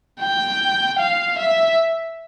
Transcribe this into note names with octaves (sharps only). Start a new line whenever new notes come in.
G5
F5
E5